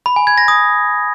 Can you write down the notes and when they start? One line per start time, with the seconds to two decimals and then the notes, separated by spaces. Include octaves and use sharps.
0.06 B5
0.16 G#5
0.27 G#6
0.38 A#6
0.48 D#6